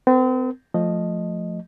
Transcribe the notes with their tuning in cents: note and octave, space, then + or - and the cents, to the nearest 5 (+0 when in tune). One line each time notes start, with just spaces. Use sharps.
C4 -40 A#4 +0
F3 +5 A3 +0 D#5 -5